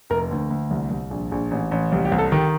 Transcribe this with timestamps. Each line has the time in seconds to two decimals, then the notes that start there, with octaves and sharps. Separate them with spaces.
0.10 F1 A#4
0.31 D2
0.51 D2
0.71 C2
0.91 C2
1.11 A#1
1.32 A#1
1.51 A1
1.71 A1
1.92 C2 G4
2.05 G4
2.12 C2
2.18 A4
2.32 D#3 G4